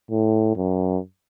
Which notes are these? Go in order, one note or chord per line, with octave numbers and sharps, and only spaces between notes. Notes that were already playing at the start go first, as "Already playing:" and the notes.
A2
F#2